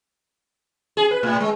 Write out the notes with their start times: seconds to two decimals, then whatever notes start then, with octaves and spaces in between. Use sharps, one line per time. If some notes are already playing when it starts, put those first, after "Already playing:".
0.97 G#4
1.11 B4
1.23 A2
1.40 G#3